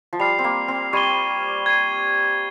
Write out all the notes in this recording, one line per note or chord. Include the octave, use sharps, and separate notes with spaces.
F3
G3 F6 C7 F7
C4
A#3
C4
G3 C#6 G#6 D#7 G7
G#6 C7 D#7